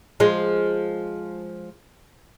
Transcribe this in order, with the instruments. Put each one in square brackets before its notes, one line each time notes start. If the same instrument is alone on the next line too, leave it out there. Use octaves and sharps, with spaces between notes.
[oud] F3 G#3